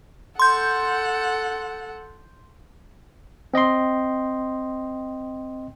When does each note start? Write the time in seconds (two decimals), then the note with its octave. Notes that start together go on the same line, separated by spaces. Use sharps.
0.39 A4 F#5 C6 G6
3.54 C4 D#5 G5 C6